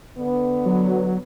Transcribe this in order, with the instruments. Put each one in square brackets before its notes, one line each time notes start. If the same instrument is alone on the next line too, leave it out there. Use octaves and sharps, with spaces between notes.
[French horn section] D3 B3
[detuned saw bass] F#3